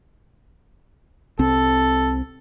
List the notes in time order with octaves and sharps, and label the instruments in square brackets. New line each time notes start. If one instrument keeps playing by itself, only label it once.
[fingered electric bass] C2 C4 [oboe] A4